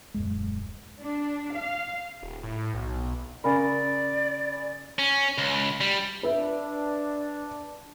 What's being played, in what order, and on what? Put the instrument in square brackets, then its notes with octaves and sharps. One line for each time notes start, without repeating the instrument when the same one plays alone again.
[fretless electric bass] D#1 F#2 G#3
[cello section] D4
F5
[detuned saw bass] D#1
A2
B1
[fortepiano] C#3 A#4 [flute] D5 [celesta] G#5 B5
[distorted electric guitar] C#4
C#2
G3
[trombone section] D4 [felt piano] B4 E5